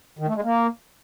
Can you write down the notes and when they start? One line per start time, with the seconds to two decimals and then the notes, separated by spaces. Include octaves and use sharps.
0.19 D#3
0.27 A3
0.36 G#3
0.44 A#3